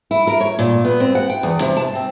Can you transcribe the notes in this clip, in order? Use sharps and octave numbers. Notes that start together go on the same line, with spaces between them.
E4
A#4
C#5
A#2
B3
C4
F#5
G5
E2
C3
A5
C4